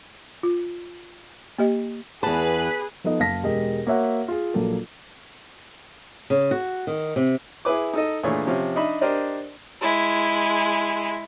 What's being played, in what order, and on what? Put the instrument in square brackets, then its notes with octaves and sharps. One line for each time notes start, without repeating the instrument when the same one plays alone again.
[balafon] F4
A#3 G4 D#5
[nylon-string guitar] E2 A5 [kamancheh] G#4 [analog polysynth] B4
[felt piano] F3 B3 D#4 A4 D#5
F#1 F5 A5 A#6 B6
E1 G#3 G4 A#4 D#5
A#3 F#4 C#5 E5 F#5
F4 G#4
A#1 F#3 A#3 A4
[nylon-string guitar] C#3
F#4
D#3
C3
[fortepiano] E4 G#4 B4 D6
D#4 A4 D#5
A#2 E3 A3 D4 G#4 C#5
C3 F3 C#4
D4 D#4 D#5 E5 B5
D4 G4 A#4 C5 D5 D#5
[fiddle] G#3 E4